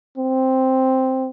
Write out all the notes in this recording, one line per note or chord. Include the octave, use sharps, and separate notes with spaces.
C4